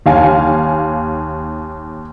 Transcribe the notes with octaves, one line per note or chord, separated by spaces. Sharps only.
D#2 F5 G#5